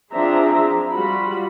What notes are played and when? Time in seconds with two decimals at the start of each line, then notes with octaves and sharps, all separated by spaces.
0.13 F3 C4 D4 G#4 E5 A#5
0.91 G3 F4 F#4 B5